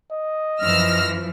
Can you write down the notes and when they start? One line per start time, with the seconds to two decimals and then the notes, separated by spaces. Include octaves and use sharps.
0.12 D#5
0.62 F#2 E3 F3 E6 F6 A#6